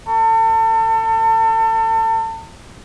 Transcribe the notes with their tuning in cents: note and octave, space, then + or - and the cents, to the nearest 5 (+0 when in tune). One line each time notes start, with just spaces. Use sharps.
A4 +35